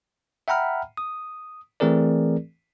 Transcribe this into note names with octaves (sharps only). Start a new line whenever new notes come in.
E5 F#5 G5 A#5 B5 F6
D#6
E3 A3 C4 G#4 A#4 D5